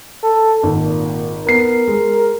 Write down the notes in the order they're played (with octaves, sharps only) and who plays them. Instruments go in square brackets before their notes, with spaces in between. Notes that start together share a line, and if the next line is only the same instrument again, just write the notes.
[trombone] A4
[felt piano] G#1 [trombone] A#2
[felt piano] B3 C7 [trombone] A#4
[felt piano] G#3